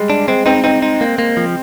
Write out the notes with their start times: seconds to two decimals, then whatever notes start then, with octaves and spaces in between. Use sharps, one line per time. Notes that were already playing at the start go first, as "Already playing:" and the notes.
Already playing: G3 G#3
0.10 D4
0.28 G#3 C4
0.46 C4 D#4
0.64 C4 D#4
0.82 D#4
1.01 A#3
1.18 A#3
1.37 F3